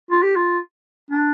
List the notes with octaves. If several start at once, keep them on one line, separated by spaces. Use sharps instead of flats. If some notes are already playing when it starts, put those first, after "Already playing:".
F4
G4
F4
D4